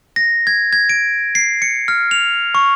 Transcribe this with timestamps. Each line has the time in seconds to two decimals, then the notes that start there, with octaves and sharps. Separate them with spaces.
0.16 A#6
0.47 G#6
0.73 G#6
0.89 D7
1.35 C7
1.62 C#7
1.88 F6
2.11 F7
2.55 C#6